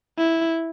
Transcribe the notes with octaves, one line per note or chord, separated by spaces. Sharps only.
E4